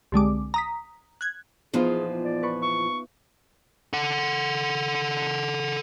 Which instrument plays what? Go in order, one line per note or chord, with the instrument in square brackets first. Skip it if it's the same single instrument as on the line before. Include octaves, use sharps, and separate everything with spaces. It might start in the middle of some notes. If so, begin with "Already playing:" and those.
[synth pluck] C2 D3 G#3 D6
A#5 D#6 B6
F#6 G#6
[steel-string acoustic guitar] E2 A#2 F3 [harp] B3 D#4 F4 [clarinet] G#4
[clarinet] D5
[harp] B4 C#6
[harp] E5 [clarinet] C#6
[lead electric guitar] A4 F#5